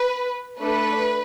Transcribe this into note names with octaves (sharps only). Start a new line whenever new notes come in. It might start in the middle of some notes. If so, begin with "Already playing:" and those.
Already playing: B4
A3 D4 A4 B4